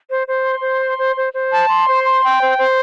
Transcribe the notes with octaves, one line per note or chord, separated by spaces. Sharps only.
C5
C5
C6
C5
C6
C5
C5
C5
A5
C6
C5
C6
G5
C5
C5